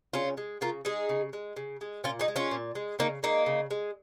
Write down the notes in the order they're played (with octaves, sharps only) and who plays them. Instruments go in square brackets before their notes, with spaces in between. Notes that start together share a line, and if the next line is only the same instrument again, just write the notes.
[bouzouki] C#3 C#4 F4
G#3
C#3 F4 A#4
G#3 D#4 G#4
C#3
G#3
C#3
G#3
A#2 C#4 F4
D#4 G#4
G#3
C#4 F4
A#2
G#3
C#3 A#3 D#4
G#3 A#3 D#4
C#3
G#3